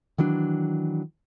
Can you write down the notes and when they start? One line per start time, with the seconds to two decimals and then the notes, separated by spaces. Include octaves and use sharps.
0.18 D#3 E3 F#3 D4